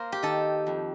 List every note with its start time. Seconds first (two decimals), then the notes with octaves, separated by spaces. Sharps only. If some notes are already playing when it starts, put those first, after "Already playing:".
Already playing: A#3 A#4 C5
0.12 G4
0.23 D#3 A4
0.67 F2